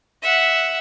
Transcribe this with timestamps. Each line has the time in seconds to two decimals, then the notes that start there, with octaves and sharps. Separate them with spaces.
0.22 E5 F#5